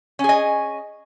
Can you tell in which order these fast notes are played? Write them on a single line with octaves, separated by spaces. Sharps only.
C#4 G#4 D#5